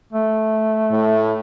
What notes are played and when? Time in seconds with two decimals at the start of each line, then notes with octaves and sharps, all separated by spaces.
0.13 A3
0.91 A2